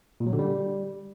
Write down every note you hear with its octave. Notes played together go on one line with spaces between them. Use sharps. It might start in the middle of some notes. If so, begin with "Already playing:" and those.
A#2
F#3
D3
G3